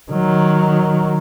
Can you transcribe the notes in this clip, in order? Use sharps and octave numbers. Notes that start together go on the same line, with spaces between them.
D#3 F#3